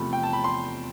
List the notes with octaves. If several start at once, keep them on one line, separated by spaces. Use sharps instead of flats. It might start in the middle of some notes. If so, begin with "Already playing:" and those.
Already playing: E2 C3 F3 A3 B5
G5
A5
B5
C6